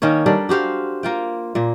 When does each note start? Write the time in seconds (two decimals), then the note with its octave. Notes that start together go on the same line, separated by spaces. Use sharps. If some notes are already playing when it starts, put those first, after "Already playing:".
0.02 D#3 A#3 C#4 C#5
0.26 G3 D4 A4 A#4
0.49 F#4 G4 C5 F5
1.03 A#3 F4 G5
1.55 A#2 A#3